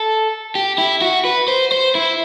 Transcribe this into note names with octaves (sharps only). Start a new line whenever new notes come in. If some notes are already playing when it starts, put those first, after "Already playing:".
Already playing: A4
G4
E4
F#4
B4
C5
C5
E4